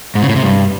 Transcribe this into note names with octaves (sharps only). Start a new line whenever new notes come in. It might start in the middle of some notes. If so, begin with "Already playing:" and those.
G#2
C#3
A2
C3
G2